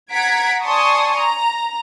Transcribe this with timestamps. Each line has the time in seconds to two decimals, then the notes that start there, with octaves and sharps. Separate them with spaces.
0.11 F#5 A#5 G#6 B6 D7
0.62 D5 G#5 A5 C6 C#6 D#6
1.18 A#5